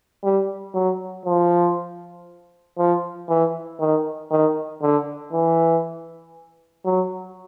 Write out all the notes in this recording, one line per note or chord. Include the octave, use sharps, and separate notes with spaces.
G3
F#3
F3
F3
E3
D#3
D#3
D3
E3
F#3